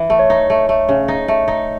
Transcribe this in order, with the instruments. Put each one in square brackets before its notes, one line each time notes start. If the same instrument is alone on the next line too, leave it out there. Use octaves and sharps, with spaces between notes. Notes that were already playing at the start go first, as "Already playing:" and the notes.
Already playing: [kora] E3
A3
[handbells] C#5
[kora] D#4
A3
A3
C#3
D#4
A3
D#4